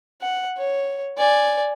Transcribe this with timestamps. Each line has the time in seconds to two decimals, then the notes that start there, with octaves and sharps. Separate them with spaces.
0.21 F#5
0.58 C#5
1.18 D5 G#5